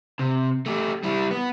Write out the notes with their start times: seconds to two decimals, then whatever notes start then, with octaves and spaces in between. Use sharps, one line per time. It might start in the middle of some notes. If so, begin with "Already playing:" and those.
0.19 C3
0.66 A3 G4
1.04 G3 E4
1.31 B3